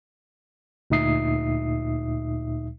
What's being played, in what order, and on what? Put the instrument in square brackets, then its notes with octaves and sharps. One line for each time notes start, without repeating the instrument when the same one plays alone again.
[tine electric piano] D2 A#2 D#4 E5 D#6 C7